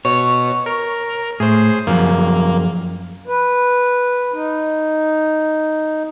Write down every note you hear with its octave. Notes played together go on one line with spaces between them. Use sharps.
B2 C#5
A#4
A2 G#4 C5
F#2 F3 A#3 G#4
B4
D#4